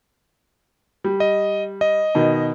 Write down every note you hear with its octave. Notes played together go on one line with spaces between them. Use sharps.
G3
D#5
D#5
B2 D#3